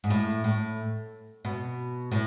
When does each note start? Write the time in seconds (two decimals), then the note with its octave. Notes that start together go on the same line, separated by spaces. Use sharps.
0.04 G#2
0.10 A2
0.44 A2
1.45 B2
2.11 A2